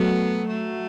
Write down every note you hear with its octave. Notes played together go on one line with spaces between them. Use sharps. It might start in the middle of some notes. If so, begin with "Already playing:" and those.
Already playing: F#3 A3 B3
A3